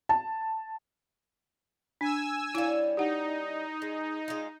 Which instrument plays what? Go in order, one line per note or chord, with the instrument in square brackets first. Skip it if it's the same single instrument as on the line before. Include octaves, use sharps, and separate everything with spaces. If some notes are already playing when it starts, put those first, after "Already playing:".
[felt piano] A5
[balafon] D4 [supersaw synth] G#5 E6
[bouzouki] G3 C#4 [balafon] E4 F5
[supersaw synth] D#4 [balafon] G4 F#5
[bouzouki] G#3
G#3 F4